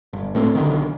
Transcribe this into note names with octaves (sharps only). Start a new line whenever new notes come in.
G1
A2 A3 B3 C4
B1 D3 D#3